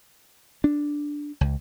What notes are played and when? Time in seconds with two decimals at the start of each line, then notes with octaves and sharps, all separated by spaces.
0.64 D4
1.41 C#2